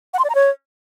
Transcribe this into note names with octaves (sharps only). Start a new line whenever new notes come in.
F#5
C6
D5
A#5
C#5